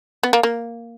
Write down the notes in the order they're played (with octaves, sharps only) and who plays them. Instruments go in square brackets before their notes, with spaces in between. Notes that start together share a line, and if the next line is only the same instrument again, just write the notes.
[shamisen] B3
A#3
A#3